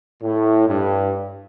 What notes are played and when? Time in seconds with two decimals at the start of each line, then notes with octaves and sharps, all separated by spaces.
0.22 A2
0.68 G2